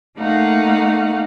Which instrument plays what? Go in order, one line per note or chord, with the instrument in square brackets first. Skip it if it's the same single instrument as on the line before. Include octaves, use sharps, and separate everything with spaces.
[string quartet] A3 A#3 D#4 F5 F#5